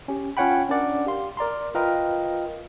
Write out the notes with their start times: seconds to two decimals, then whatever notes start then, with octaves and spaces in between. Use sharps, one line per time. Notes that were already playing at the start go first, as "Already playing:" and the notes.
0.08 C#4 G4
0.37 C#4 F4 C#5 F#5 G5 B5
0.69 C#4 D4 A#4 D5 F#5
1.06 G4 F5 C6
1.37 A#4 D5 A#5 C6
1.75 F4 A#4 B4 D#5 F5 G5